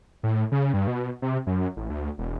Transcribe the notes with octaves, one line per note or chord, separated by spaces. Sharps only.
A2
C#3
G2
B2
C3
F#2
A1
D2
E1